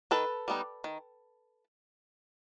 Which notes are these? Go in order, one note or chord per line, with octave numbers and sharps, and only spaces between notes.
D#3 A4 B4
G3 B3 D#4
D#3